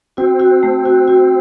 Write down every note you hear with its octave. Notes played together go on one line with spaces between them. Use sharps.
C4 F#4
F#4
A3
F#4
F#4